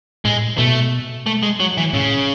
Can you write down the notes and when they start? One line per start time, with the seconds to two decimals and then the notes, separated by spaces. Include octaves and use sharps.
0.25 A2 G#3
0.58 B2 A3
1.26 A3
1.43 G#3
1.60 F#3
1.78 E3
1.94 A2 C#3